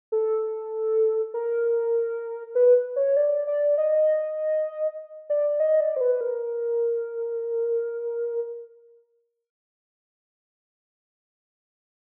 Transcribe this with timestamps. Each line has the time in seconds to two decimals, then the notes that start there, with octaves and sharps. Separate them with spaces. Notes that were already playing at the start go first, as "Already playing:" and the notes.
0.12 A4
1.34 A#4
2.55 B4
2.96 C#5
3.17 D5
3.47 D5
3.78 D#5
5.30 D5
5.60 D#5
5.80 D5
5.96 C5
6.01 B4
6.21 A#4